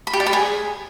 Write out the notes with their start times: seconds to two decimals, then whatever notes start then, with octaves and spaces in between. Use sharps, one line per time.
0.07 B5
0.13 G4
0.20 D5
0.26 B5
0.33 G#4